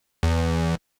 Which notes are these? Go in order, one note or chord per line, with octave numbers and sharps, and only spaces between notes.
E2